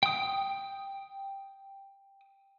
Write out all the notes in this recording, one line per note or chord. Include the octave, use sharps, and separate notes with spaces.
G5 D#6